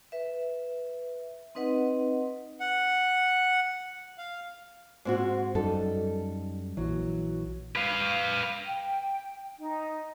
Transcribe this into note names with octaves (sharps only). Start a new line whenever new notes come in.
B4 E5
C4 D#4 B4 D#5 F#5
F#5
F5
G#2 C4 F#4
F#2 G3 D#4 A4
A#1 E3 F#3
B4 F5
G5
D#4